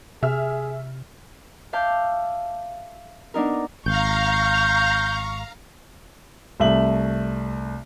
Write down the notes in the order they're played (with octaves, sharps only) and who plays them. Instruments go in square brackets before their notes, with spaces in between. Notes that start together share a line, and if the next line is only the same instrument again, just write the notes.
[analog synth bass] C3 [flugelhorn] G#4 [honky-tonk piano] E5 F6
[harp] E5 F5 A5 D6 G6
B3 D4 D#4 A#4
[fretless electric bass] G#1 [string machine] F5 A#5 [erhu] C#6 [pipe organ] G6
[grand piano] C2 A3 E5 F#7